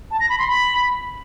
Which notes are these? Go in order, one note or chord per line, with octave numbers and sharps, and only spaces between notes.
A5
A#6
B5
C6
B5